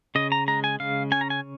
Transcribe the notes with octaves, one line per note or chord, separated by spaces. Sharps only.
C#3 D#5
A#5
G#3 A#5
G#5
C#3 F5
C#4 G#5
A#5
G#5